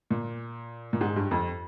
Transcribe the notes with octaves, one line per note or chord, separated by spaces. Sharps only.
A#2
A#2
G#2
G2
F2